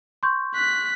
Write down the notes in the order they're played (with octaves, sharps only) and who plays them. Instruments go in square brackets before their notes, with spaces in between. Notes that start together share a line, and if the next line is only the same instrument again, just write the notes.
[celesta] C6 C#6 G6
[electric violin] F#6 B6